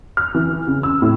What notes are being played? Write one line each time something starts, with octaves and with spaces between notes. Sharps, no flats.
F6
E3
C#3
E6
A2